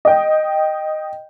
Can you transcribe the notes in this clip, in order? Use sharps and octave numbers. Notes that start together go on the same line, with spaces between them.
D#5 G5